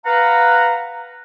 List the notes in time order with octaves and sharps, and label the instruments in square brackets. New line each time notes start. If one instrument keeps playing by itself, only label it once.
[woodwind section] B4 F5 F#5 A#5